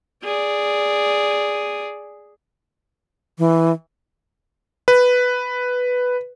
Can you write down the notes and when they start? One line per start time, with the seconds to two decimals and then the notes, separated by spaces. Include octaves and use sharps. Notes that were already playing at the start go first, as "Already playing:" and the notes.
0.24 G#4 D5
3.39 E3
4.88 B4